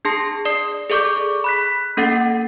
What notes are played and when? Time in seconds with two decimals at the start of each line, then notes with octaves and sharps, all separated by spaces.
0.05 D4 G#4 A5 C6 A#6 C7
0.45 D5 D#6 C7
0.90 G#4 A4 D5 C#6 D6 G6
1.44 B5 F#6 B6
1.97 A#3 C#4 A4 F#5 A6 C7